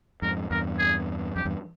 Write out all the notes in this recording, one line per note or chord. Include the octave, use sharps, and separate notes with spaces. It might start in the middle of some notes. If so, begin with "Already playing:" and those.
F2 G#2 A#4
E2 G2 A#4
G#4
F2 G4
E2 G2